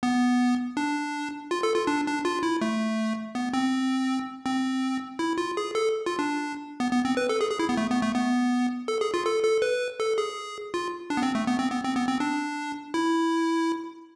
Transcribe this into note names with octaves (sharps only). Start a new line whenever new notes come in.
B3
D4
F4
A4
F4
D4
D4
F4
E4
A3
B3
C4
C4
E4
F4
G#4
A4
F4
D4
B3
B3
C4
B4
A4
G#4
G#4
E4
B3
A3
B3
A3
B3
A4
G#4
F4
A4
A4
B4
A4
G#4
F4
D4
B3
C4
A3
B3
C4
B3
C4
B3
C4
D4
E4